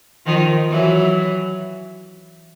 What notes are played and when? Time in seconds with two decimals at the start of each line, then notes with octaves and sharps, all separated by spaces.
0.26 D#3 F3
0.70 E3 F#3